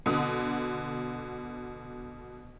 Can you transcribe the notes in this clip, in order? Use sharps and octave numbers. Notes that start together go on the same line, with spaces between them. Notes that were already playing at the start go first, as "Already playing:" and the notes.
B2 D3 D#6